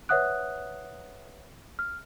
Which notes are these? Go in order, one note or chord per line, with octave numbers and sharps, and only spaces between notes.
B4 C#5 E5 F#5 D#6 F#6
F6